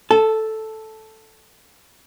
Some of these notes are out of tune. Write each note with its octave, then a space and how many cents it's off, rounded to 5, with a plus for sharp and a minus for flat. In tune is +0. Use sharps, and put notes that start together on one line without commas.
A4 +0 A5 -25